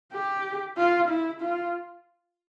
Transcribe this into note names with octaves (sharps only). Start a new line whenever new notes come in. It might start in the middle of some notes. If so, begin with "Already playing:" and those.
G4
F4
E4
F4